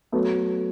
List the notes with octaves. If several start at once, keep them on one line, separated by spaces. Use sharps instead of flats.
F#3 A3 B3